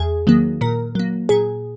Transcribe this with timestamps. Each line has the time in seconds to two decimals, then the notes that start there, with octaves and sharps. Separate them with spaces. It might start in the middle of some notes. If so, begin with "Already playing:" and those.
Already playing: E2 G#4
0.27 D#3 F#3 A#3
0.61 A#2 A#4
0.95 F#3 A#3
1.29 A#2 G#4